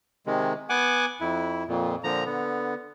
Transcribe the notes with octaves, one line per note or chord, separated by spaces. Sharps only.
C3 D#3 G#3
B3 F#5 G#5 D6
F2 E4
F2 A#2
A#2 D3 F3 A#5
D3 B3